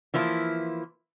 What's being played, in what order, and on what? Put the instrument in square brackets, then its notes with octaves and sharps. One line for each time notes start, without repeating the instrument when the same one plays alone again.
[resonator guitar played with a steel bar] E3 F3 A#3 E4